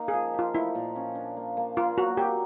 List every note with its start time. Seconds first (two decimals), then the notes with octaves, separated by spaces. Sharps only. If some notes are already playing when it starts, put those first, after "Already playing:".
Already playing: A#3 D#4
0.08 G#4
0.13 F3
0.34 F4 G4
0.54 F3 E4
0.75 A#2
0.96 C#4
1.15 D4
1.37 A#3
1.57 A#3
1.77 A#3 F4
1.98 F#3 F#4
2.17 F#3 G4